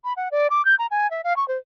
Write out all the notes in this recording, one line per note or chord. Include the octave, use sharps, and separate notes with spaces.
B5
F#5
D5
D6
G6
A#5
G#5
E5
F5
C#6
C5